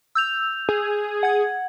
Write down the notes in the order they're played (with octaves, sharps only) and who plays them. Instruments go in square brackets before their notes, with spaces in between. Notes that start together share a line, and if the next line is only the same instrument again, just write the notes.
[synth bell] E6 G6 F7
[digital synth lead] G#4
[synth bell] F#5 G#6